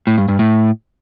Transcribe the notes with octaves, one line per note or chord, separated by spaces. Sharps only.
A2
G2
G2
A2